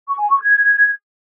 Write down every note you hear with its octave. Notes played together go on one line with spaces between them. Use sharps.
C#6
G#5
C#6
G#6